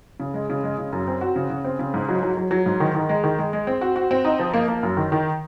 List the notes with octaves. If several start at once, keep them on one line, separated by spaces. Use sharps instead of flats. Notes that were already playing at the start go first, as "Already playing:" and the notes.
C#3
G#3
C#3
G#3
C#3
F#2
C4
F#4
C#3
C#3
C4
C#3
G#2
F#3
F#3
F#3
F#3
G#2
D#3
D#3
G#3
D#3
G#3
G#3
C4
F#4
F#4
C4
D#4
F3
A#3
A#3
F#2
D#3
D#3